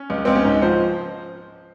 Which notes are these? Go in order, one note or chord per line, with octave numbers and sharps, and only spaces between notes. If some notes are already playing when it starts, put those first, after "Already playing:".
Already playing: C#4
C#2
C#2 C4
C#4
G#2 D#4
F3 C5